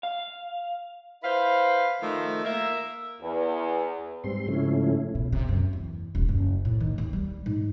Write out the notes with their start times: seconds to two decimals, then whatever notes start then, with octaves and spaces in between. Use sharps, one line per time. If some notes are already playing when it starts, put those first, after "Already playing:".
0.03 F5
1.23 E4 B4 C5 F5
2.02 D#3 F3 A3
2.45 A#3 A#4 E5
3.21 E2
4.24 G#2 G3 C4 C6
4.48 G#2 C#3 F3 A3 C#4 E4
5.15 B2
5.32 C3
5.49 F#2
5.73 E2
6.15 D#1
6.29 F#1
6.65 A2
6.80 D#3
6.98 D#2
7.13 G3
7.46 G#2